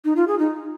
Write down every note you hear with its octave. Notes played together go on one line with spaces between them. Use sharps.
D#4
F4
G#4
D#4